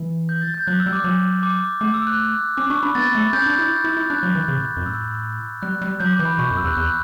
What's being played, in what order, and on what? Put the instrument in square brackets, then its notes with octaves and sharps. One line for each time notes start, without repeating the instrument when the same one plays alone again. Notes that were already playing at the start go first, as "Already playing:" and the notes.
Already playing: [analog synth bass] E3
[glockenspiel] G6
A6
G6
[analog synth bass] F#3 [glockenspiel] F#6
[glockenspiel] E6
[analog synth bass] G3
[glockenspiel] D6
[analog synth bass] F#3 [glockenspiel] D6
[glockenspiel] D6
[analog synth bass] A3 [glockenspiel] D6
[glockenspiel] E6
F#6
[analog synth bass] C#4 [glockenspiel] D6
[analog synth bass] D4 [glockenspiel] C#6
[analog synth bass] D4 [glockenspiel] B5
[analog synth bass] B3 [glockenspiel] A6
[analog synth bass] A3
[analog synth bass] C#4 [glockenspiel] G6
[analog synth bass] D4
E4
E4
E4
[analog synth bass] D4 [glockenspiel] F#6
[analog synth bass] F#3
E3
C#3
A2
F#2
[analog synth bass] A2 [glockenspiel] E6
[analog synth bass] G3 [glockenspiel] F#6
[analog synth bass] G3
[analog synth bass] F#3 [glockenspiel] G6
[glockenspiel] D6
[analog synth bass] E3
[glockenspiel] B5
[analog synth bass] B2 [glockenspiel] C#6
[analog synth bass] F#2
[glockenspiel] E6
[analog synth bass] E2 [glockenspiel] F#6
[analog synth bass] E2 [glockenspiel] F#6